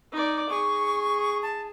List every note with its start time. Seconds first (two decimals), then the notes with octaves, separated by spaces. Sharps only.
0.12 D#4 D5
0.49 G#4 C#6
1.43 A5